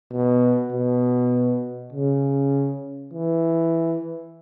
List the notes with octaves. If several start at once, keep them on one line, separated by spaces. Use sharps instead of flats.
B2
B2
C#3
E3